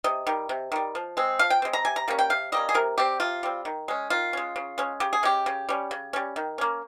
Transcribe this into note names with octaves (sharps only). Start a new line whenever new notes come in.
C3 D#5
D#3 G3
C3
D#3 G3
F3
G#3 C4
F3 F5
G5
G#3 C4
A#5
C3 G#5
A#5
G3 A#3 C#4
G5
C3 F5
G3 A#3 C#4 D#5
G#4
C3 A#4
G3 C4 G4
C3 F4
G3 C4
D#3
G#3 C#4
D#3 F4
G#3 C#4
C#3
G#3 C#4
C#3 G4
G#4
G#3 C#4 G4
C#3
G3 C#4
C#3
G3 C#4
D#3
A#3 C#4